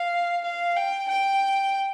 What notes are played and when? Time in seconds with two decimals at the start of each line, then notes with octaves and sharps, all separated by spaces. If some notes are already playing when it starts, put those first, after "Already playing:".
Already playing: F5
0.44 F5
0.76 G5
1.08 G5